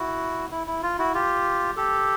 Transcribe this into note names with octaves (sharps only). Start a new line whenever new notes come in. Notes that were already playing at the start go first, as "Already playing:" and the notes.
Already playing: E4 F#4
E4
E4
F4
E4 F#4
F4 G4
G4 A4